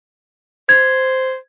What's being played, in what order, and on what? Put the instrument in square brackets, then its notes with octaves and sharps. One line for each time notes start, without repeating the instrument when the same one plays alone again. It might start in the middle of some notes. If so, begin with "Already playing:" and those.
[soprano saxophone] C5 [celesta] G#6